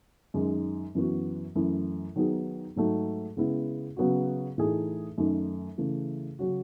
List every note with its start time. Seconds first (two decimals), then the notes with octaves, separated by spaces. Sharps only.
0.34 F#2 D#3 G#3 D#4
0.95 F#2 E3 B3 F#4
1.55 F#2 E3 A3 E4
2.16 D#3 F#3 B3 D#4 G#4
2.76 G#2 F#3 A3 D#4
3.37 C#3 G#3 B3 E4
3.97 C#3 F#3 B3 F#4
4.58 A2 E3 A3 D#4 G#4
5.18 F#2 D#3 A3 D#4
5.78 C#3 E3 A3
6.39 C#3 F#3 C#4 F#4